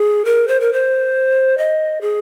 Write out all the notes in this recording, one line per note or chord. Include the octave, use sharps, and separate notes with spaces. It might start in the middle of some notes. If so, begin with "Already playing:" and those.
Already playing: G#4
A#4
C5
A#4
C5
D#5
G#4